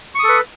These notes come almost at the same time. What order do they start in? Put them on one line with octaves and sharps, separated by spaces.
C#6 D#6 A4 B4